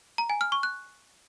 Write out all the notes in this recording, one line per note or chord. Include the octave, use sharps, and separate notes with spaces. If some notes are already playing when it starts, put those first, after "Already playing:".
A#5
G#5
F6
C#6
F#6